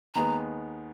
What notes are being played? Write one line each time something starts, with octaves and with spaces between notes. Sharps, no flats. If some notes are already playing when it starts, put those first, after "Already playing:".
D#2 D#3 G#3 B3 A#5